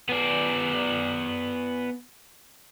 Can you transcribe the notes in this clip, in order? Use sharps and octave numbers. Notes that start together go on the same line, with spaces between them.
B3 D5